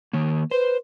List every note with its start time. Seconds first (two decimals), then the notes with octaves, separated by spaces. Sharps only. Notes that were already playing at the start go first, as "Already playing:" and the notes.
0.13 D#3 A#3
0.51 B4 C5